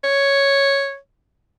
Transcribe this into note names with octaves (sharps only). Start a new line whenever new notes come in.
C#5